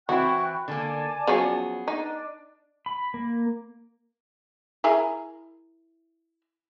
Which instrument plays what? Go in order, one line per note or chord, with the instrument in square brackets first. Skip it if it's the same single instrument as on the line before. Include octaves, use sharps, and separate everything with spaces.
[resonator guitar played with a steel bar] E3 C4 E4 [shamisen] F#4 [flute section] G5 C#6 F#6
[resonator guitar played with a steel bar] D3 A#3 [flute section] D5 G#5 A5
[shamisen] F3 F#3 C#4 [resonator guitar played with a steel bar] B3 G#4
[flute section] D4 [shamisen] D#4
[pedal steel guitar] B5
A#3
[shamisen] E4 G#4 A#4